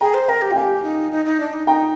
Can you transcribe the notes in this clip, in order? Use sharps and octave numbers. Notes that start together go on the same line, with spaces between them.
G#4 G5 A#5
C5
A#4 G5 A#5
G4
F4 G5
G4 F5 G#5
D#4
D#4
D#4
D4
D#4
D#4 G5 A#5